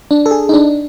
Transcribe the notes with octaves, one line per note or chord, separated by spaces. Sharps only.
D4
A4
G#4
D#4
D4